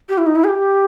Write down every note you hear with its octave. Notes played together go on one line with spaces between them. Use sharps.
G4
E4
D#4
E4
G#4
G4